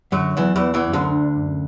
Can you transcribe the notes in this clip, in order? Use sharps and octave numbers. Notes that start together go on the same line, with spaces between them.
F#2 D3 F#3
E2 E3 F#3
E2 E3
B3
E2 E3
F#2
D2 D3
D4
F#2